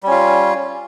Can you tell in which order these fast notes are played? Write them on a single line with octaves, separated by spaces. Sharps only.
G3 C#4 F4